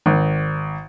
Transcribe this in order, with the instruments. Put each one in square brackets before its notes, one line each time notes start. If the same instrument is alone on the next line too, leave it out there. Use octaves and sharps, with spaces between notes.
[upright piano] G#1